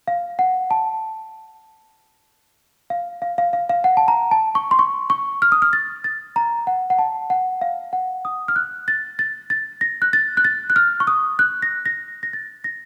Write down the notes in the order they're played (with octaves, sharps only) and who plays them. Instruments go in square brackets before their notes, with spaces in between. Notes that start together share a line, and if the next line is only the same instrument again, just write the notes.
[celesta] F5
F#5
A5
F5
F5
F5
F5
F5
F#5
A5
A#5
A5
C#6
C6
C#6
C#6
F6
D#6
F6
A6
A6
A#5
F#5
F#5
A5
F#5
F5
F#5
D#6
F6
F#6
A6
A6
A6
A#6
F#6
A6
F#6
A6
F#6
F6
C#6
D#6
F#6
A#6
A#6
A#6
A6
A#6